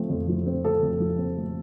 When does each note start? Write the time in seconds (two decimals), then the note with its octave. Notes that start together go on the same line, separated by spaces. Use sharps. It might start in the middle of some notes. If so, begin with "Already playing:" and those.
Already playing: F3 A3 C4
0.09 F2
0.28 F3
0.46 C4
0.64 A3 A4
0.82 F2
1.00 F3
1.18 C4
1.37 A3